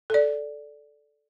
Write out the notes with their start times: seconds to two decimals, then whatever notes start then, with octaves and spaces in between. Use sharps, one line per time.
0.10 A4 D5